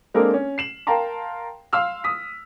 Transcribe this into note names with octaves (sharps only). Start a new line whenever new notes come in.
G#3 A#3 C4 D4 A4 A#4
C#4
C7 E7 F#7
A#4 F5 G5 A5 A#5 C6
F5 C6 E6 F6
D#6 B6